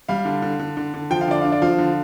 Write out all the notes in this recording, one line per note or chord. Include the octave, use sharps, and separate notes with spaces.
G3 F5
D3
D3
D3
D3
D3
F3 G5
F5
D3 D5
D4 F5
D5
F3 F5
D3